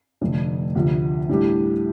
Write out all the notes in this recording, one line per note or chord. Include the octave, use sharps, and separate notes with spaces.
F1 F2 D3 A3
D2 C3 F3
A2 G3 D4 G4